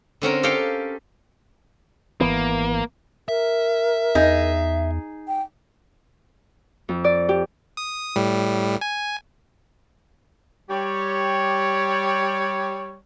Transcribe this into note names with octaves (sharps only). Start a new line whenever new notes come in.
D3 C4 C#4 A#4
G4 A4 C#5 F5 G5
G#1 E3 A#3 B3
A#4 E5
E2 D#4 G#4
G5
F2
D5
G4
D#6
A2 G3
G#5
G3 G4 C#5